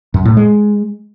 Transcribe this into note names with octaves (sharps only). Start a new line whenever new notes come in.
F#2
A2
G#3